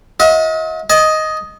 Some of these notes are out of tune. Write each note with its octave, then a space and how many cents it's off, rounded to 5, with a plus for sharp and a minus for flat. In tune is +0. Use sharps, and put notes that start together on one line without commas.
F4 +45 D#5 +40
D#5 +5 A5 -45